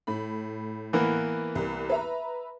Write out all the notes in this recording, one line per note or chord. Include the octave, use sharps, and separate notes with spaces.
A2 B5
E3 A#3 B3
C2
B4 E5 A#5